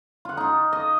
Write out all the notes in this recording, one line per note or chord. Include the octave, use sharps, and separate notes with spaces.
F4 F#5
D#4 F4
D#5